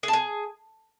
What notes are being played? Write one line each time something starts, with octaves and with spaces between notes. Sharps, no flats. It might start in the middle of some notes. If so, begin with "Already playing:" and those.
G#4
A5
G#4